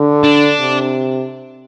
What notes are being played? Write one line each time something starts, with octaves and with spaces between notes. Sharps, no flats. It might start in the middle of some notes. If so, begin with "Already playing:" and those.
Already playing: D3
D4
C3